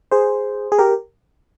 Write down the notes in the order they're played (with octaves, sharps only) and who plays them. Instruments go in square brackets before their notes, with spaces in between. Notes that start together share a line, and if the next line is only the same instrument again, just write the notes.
[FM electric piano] G#4 C5
G#4
G4 A#4